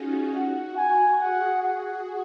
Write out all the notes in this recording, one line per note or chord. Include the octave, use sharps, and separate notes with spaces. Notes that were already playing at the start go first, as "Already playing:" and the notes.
Already playing: C#4 D#4 F4 F#4 G#4
F#4 F#5
F#4 G#5
G#4 F#5
F#5